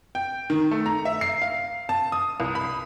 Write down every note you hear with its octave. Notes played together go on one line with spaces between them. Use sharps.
G5
D#3
A3
A#5
E5
C7
F5
A5
D#6
C2
B5